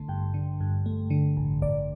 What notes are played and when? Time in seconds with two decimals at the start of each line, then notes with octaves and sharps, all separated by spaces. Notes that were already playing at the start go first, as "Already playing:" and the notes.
Already playing: A1 D3 A3 A5 C6
0.08 G2 G5
0.34 D3
0.61 G2
0.86 A3
1.10 D3
1.37 A1
1.62 A1 D5